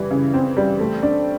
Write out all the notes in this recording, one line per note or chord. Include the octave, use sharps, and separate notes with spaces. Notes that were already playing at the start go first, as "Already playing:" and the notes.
Already playing: E3 G3
C#3
C4
G3
A3
D4